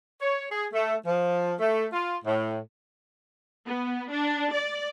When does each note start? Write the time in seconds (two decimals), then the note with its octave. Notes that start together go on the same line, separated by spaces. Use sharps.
0.21 C#5
0.51 G#4
0.73 A3
1.05 F3
1.59 A3
1.93 F4
2.25 A2
3.66 B3
4.11 D4
4.53 D5